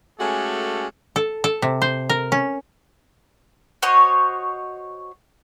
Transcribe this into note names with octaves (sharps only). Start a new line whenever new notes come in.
G#3 A3 C#4 F#4 G4 A4
A4
A4
C3
C5
A#4
C#4
F#4 C5 C#5 D#5